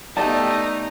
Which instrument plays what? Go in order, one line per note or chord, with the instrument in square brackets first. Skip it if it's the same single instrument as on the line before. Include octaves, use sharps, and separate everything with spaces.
[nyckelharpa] A3 B3 [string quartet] D#4 [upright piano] G4 D5 [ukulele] A5